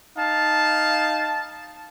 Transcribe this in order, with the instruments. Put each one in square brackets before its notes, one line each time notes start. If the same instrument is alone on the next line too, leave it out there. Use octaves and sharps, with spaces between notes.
[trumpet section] D#4 F5 A5